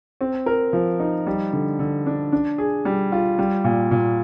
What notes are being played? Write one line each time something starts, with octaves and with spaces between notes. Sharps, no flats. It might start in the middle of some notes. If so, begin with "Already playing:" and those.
C4
A#4
F3
D#4
G3
D3
D3
D4
D4
G#4
G3
F4
G3
A#2
A#2